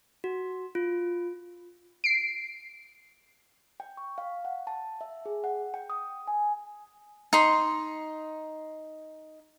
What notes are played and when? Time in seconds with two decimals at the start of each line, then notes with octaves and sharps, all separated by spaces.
0.24 F#4
0.75 F4
2.04 C7 D7
3.80 G5
3.97 C#6
4.18 F5
4.45 F#5
4.67 A5
5.01 E5
5.26 G#4
5.44 F#5
5.74 G5
5.90 D#6
6.27 G#5
7.33 D#4 C6